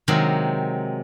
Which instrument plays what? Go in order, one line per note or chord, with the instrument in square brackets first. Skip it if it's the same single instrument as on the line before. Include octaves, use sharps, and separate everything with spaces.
[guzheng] C3 D#3 F#3 G#3